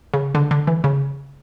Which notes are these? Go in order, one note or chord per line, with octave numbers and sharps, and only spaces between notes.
C#3
D3
D3
E3
C#3